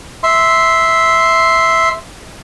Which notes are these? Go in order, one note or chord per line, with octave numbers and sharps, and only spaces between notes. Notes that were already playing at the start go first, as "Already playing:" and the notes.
E5 C6